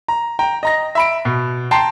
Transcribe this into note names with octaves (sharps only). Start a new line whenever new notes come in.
A#5
G5 A#5
D#5 A#5 A#6
E5 B5 D7
B2
G5 A5 A#5 C6 C7